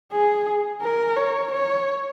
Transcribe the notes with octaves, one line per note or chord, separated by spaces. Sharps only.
G#4
A#4
C#5
C#5